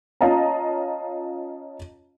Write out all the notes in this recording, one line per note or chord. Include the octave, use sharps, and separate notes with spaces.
C#4 F4 D#5 F5 A5 A#5